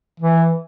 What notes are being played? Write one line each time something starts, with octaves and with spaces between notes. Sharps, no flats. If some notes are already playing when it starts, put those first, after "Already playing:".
E3